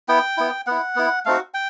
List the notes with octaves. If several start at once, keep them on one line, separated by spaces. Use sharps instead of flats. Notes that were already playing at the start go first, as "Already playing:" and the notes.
B3 E4 G5
B3 E4
B3 E4 F#5
B3 E4
A3 C4 D#4 F#4 F5
G5